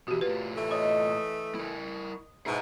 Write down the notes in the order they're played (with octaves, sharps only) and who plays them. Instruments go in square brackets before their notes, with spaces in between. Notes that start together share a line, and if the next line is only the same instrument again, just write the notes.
[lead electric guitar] B2 E3 [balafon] F#4 G4
[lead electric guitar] A2 F4 [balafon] B4
[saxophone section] E3 A3
[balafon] C#5 [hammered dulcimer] D#5
[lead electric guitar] E4 A#4
[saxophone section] G#2 B2 [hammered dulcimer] E4 [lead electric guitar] G#4 A#5